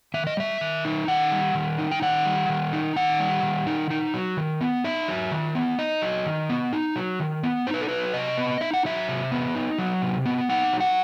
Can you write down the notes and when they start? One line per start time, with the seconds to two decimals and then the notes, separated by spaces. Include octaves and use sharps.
0.14 D#3 E5
0.27 D#5
0.37 G3 E5
0.61 D#3
0.85 D#4
1.08 D#3 F#5
1.32 G3
1.55 D#3
1.79 D#4
1.91 G5
2.02 D#3 F#5
2.25 G3
2.49 D#3
2.73 D#4
2.96 D#3 F#5
3.20 G3
3.43 D#3
3.67 D#4
3.90 D#4
4.14 F#3
4.37 D#3
4.61 B3
4.84 D#4 E5
5.08 F#3
5.32 D#3
5.55 B3
5.79 D#4 D#5
6.02 F#3
6.26 D#3
6.49 B3
6.73 D#4
6.96 F#3
7.20 D#3
7.43 B3
7.67 D#4 C5
7.74 B4
7.81 A4
7.88 F#3 B4
8.14 C3 D#5
8.37 B3
8.61 D#4 E5
8.74 F#5
8.85 F#3 E5
9.08 C3
9.31 B3
9.55 D#4
9.79 F#3
10.02 C3
10.26 B3
10.49 D#4 F#5
10.73 F#3
10.80 F#5